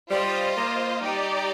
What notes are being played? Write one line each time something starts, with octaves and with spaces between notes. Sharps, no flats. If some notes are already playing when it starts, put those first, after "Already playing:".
G3 F4 C5 D#5
A#3
G3 D#4 G4 D5